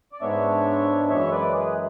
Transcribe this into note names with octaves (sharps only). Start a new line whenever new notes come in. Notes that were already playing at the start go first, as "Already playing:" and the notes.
D5
G#2 G#3 B3 D4 C#5 E5
F#2 E3 G#3 C#5 E5
B4 D5
G#4 B4